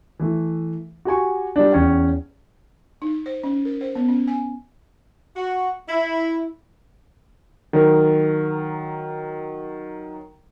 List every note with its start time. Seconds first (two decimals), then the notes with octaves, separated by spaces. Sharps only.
0.19 E3 A3
1.05 F#4 G4 G#5 C#6
1.56 G3 D4
1.72 E2 C#4 G5
3.02 D#4
3.26 C5
3.44 C#4
3.65 A#4
3.81 C5
3.95 B3
4.09 C#4
4.28 G#5
5.36 F#4
5.89 E4
7.73 D#3 F#3 A#4